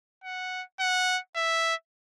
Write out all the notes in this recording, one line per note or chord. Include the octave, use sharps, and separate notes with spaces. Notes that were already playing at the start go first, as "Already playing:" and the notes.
F#5
F#5
E5